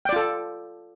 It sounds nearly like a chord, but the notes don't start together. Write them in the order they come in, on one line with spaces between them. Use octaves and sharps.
G5 D5 F4 A4